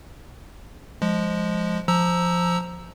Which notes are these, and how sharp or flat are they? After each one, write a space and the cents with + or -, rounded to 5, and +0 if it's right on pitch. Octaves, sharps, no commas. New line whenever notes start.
F3 +0 G#3 +0
F3 +0 A#5 +0 E6 +0